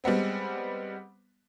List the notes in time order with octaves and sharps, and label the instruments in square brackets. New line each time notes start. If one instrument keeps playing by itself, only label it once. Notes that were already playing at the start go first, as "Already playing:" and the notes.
[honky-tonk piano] G3 G#3 B3 C4